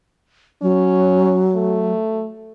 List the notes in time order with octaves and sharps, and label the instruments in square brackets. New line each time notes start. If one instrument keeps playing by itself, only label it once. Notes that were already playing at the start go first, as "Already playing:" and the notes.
[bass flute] F#3 [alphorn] C#4
[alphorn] A3